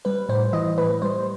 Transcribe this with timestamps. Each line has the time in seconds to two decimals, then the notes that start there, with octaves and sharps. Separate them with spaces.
0.05 G3 B4
0.29 A2 C5
0.53 E3 D#5
0.78 A2 B4
1.02 G3 C5